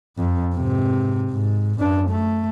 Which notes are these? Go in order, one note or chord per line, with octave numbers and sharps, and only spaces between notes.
F2
G#2 C3
G#2
F#2 D4
A3